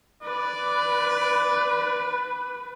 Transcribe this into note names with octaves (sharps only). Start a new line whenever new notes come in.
B4 D5